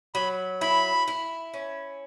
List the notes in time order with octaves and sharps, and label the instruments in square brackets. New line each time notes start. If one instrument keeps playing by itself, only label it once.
[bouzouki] F#3 [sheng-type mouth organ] B5
[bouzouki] E4 [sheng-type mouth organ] B5
[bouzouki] E4
C#4